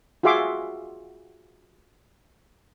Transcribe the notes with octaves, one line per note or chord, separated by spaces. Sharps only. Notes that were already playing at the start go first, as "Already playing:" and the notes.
F4 F#4 G#4 E5 C6 D6